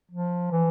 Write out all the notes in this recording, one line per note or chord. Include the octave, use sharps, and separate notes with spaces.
F3
E3